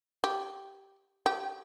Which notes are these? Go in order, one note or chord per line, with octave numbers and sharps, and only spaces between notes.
G4
G4